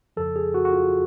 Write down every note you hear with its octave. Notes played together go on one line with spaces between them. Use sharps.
F2 C#3 F3 A4
G#4
F#4
F#4
F4